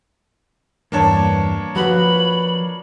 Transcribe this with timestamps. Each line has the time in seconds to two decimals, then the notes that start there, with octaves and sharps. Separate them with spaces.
0.92 E2 G2 A#3 D4 C#5 A5
1.76 F3 F#4 B4 B5